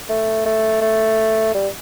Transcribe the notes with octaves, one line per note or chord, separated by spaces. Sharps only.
A3
A3
A3
G3